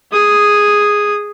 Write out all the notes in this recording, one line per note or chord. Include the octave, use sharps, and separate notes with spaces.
G#4 D#6